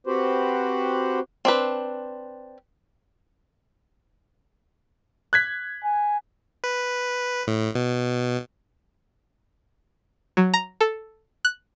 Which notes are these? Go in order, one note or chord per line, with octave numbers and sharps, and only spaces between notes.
C4 F#4 G4 B4 C5
C4 D4 B4
F#6 G#6 B6
G#5
B4
A2
B2
F#3
A#5
A4
F#6